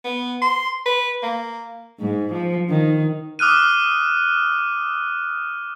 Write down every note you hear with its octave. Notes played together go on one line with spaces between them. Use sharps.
B3
C6
B4
A#3
G#2
F3
D#3
D6 D#6 F6 F#6 D#7